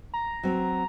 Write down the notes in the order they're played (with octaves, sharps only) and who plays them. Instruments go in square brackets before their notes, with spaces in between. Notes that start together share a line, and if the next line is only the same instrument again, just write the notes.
[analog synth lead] A#5
[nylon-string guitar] F#3 C4